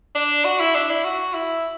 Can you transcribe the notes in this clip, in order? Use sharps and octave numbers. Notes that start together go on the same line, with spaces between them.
D4
F#4
E4
D4
E4
F#4
E4